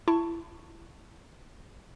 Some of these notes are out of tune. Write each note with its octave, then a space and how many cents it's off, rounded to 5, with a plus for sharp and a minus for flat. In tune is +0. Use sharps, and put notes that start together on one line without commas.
E4 +25 A5 +15 C#6 +0